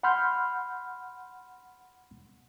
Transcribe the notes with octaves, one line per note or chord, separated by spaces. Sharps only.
F#5 B5 C6 F6 G6